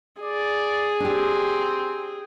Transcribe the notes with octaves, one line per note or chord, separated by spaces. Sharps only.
G#4 D5
C4 D4 G4